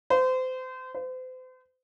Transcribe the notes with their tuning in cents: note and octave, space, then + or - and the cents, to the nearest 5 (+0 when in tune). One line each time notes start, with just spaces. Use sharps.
C5 -30
C5 -40